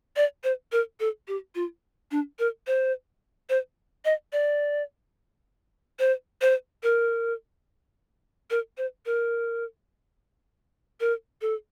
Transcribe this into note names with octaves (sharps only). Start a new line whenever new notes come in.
D5
C5
A#4
A4
G4
F4
D4
A#4
C5
C5
D#5
D5
C5
C5
A#4
A#4
C5
A#4
A#4
A4